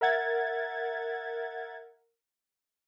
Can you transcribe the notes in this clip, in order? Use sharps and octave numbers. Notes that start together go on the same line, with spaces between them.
A#4 E5 F#5 G#6 A6